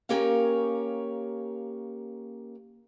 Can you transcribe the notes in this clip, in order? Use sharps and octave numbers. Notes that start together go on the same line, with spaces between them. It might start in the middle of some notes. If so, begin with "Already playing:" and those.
A#3 C#4 G4 A#4 C#5 F5